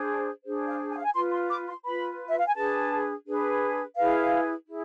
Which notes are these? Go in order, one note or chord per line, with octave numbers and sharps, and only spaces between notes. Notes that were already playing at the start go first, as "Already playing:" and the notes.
Already playing: D4 G#4 C5
D4 G#4 C5
F5
G#5
F5
G#5
F4 B4 C6
C6
D6
C6
F4 B4 B5
E5
F5
G#5
D4 G#4 B4 A5
D4 G#4 B4
E4 G#4 B4 F5
E4 G#4